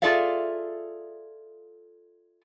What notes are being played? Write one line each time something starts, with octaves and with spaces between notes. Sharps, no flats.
F4 G#4 A4 D5 E5 F5